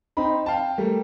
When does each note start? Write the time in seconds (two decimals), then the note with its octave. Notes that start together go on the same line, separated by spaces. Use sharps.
0.17 C4 D#4 B5
0.46 F5 G5 A5
0.78 G3 A3 A#3